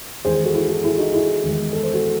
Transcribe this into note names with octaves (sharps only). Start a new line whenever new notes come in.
E2 D#3 G#3 G#4 C5
G#4 C5
F#4 A4
E4 G#4
F#4 A4
E4 G#4
D#4 F#4
E4 G#4
E2 D#3 G#3
A4
C5
F#4 A4